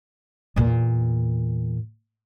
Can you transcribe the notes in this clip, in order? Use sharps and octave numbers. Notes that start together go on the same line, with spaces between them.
E2 A#2